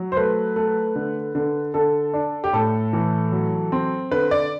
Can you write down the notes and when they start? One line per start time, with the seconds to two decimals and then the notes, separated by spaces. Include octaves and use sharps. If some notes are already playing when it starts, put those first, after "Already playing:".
Already playing: F#3
0.12 C5
0.17 A3 B4
0.56 A3
0.96 D3
1.35 D3
1.74 D3 A4
2.14 D4
2.44 G4
2.53 A2 A4
2.93 E3
3.32 F#3
3.72 C4
4.11 D3 B4
4.31 D5